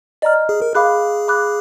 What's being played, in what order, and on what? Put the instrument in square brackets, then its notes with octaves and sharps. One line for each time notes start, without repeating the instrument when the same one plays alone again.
[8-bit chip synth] D5 [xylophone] D#5 A#5 F6
[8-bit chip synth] G#4
A#4
[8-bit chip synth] G#4 [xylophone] F5 B5 D6 F#6
[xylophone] F5 B5 D6 F#6